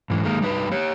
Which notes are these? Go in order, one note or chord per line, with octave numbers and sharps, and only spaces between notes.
G#2 E3
D#3 G#3 A#3
G3 D#4 B4
G4 C#5